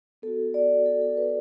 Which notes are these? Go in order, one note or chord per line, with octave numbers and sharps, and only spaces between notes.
B3 F#4 A4
D5
A4
A4
B4